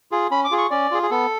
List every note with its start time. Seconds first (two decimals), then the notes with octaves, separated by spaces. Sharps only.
0.12 F4 G#4
0.31 C#4 B5
0.44 D6
0.51 F4 G#4
0.58 C#6
0.71 C#4 D5
0.91 F4 G#4
1.03 G#4
1.10 B3 A4